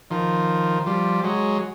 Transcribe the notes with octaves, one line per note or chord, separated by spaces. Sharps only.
D#3 F3
F3 G3
F#3 G#3